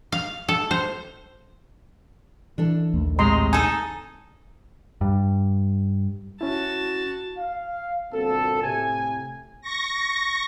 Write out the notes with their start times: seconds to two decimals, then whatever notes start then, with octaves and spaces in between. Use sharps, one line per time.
0.12 F5
0.48 A4
0.71 C5
2.58 E3 D4 A4
2.94 A#1 D#2 A3
3.19 A2 C3 G#3 D#5 A#5 C6
3.53 D#4 A4 G#5
5.01 G2
6.41 C#4 E4 F#4 A5
7.37 F5
8.13 G1 A#2 C4 F#4 A4
8.63 A2 C3 G#5
9.61 C#6 A#6